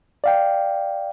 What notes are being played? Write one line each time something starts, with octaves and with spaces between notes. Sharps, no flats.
D5 F5 G5